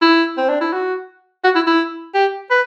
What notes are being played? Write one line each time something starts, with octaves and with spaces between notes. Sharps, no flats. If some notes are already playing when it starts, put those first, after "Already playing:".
E4
C4
D4
E4
F#4
F#4
E4
E4
G4
B4